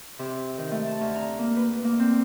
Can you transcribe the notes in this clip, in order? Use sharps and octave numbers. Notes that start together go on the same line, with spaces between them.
C3
D#3
A3
A5
D2
A#5
A#3
B4
A#3
C4